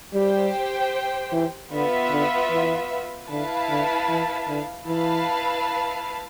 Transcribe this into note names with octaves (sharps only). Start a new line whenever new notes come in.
G3 G4 C5 G5
E3
D3 B3 F4 B4 E5
D3
E3
D3 E4 B4 F5 A5
D3
E3
D3
E3 E4 B4 F5 A5